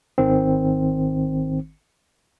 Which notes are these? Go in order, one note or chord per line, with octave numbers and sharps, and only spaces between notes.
G#1 D#3 C4